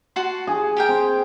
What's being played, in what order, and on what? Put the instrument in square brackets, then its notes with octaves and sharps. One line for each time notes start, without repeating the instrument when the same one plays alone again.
[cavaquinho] F#4 A5 C6
[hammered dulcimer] G#4
[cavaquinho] G4 A#4 G5
[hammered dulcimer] C4